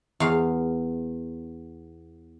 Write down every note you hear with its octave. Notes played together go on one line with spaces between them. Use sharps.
E2 F5